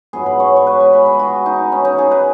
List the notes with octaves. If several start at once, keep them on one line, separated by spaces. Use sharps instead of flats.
G#2 F#3 B3 G#4
B4
C#5
C#5
B4
G#5
B5
G#4
F#4
D#4
C#4
D#4
G#4
B4